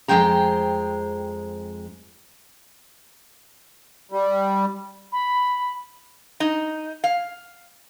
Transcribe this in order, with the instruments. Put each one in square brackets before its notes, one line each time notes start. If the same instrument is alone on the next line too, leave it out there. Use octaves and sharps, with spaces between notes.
[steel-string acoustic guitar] F2 G#2 G#3 C5 G5 A#5
[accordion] G3
[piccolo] B5
[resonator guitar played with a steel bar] D#4
F5